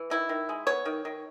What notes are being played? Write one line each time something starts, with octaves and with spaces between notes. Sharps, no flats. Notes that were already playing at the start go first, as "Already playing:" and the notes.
Already playing: E3
D#3 E4
D#3
G#3
B3 C#5
D#3
D#3